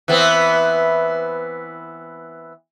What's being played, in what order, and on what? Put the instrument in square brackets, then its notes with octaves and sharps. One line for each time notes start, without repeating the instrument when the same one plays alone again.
[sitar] E3 B3 C4